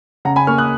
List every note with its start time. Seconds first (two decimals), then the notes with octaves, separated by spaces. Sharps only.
0.25 C#3 F#5 A#5
0.36 G#5 B5
0.47 A#3 C#6 F6
0.58 D#6 F#6